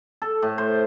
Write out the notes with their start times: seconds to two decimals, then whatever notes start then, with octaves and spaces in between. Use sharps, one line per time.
0.22 A4
0.42 A2
0.58 C5